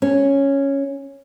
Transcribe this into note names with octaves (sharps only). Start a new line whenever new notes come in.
C#4